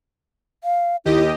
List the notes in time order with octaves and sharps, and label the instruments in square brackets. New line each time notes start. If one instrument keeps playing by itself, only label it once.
[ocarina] F5
[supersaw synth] D#2 G4 D#5 [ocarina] E4